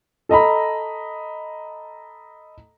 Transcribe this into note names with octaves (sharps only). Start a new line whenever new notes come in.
A4 D#5 A#5 B5